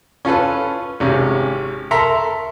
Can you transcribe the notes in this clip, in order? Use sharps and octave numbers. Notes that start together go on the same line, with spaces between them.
C#4 F4 A4 B4
G#1 C3 C#4
A4 A#4 E5 A#5 C6